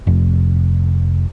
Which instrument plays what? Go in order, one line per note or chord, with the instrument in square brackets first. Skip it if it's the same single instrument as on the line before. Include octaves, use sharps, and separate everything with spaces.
[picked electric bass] F1